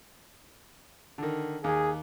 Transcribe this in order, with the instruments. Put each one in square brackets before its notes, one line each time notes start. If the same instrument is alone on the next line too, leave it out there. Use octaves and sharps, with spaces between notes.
[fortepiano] D3 D#3
[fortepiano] D#2 [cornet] G#4